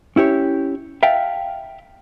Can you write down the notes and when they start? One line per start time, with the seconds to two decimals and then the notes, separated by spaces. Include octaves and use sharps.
0.16 C#4 E4 G4 C#5
1.03 E5 F5 G5 A5